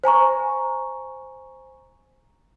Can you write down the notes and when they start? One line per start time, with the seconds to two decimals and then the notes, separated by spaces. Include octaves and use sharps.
0.04 C5 G#5 A#5 C#6